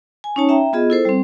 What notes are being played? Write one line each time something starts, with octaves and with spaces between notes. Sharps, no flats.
G#5
C#4 D#4 C#5 A5
E5 G5 A#5
B3 F4 G#4 D#5
E4 A4 C5
G3 C4